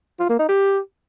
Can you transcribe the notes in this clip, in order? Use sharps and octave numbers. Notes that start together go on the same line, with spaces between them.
F4
A#3
D#4
G4